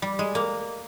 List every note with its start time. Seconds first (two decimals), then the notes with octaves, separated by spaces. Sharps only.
0.02 G3
0.19 G#3
0.35 A#3